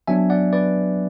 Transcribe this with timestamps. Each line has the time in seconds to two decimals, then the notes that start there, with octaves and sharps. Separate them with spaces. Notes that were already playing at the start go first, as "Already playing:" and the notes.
0.07 F#3 B3 D4 E5 G#5
0.30 D5 F#5
0.53 B4 D5